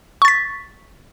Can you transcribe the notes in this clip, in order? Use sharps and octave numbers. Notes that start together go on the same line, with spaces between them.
C#6 A6 B6